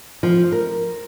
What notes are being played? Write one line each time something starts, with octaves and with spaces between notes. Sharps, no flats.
F3
A#4